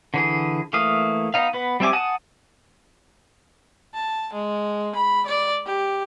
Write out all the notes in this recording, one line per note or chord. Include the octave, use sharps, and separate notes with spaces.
D3 E3 G#4
E3 A3 A#3 F5 D#6
B3 D#4 F5
B3 B4
G3 C4 E5 G#5 D6
F#5 G#5 A5 D#6
A5
G#3
B5
D5
G4